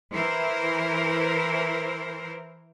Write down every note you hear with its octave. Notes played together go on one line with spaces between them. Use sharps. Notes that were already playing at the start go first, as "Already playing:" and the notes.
E3 E4 A#4 C5